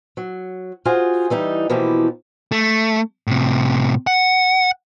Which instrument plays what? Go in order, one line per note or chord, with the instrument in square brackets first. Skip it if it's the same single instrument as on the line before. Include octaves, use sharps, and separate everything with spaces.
[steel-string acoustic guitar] F#3
F4 F#4 G#4 C5 G#5
E3 G3 D#4
B2 E3 F3 A#3 E4 G4
[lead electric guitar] A3
A2 C3
F#5